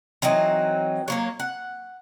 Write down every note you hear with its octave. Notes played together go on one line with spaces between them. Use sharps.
E3 F#3 C4 D#4
F#3 A#3 C#5
F#5